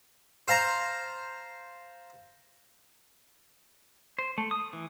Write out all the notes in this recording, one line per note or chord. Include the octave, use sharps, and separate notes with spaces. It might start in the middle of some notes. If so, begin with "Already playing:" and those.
C5 F5 A5 A#5
C5
A3
D#6
E3